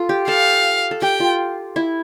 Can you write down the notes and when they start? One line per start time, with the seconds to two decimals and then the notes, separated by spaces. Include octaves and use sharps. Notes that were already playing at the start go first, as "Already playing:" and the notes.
Already playing: F4 A4
0.09 G4
0.28 A4 F5
0.91 A4
1.02 G4 G5
1.20 F4
1.76 E4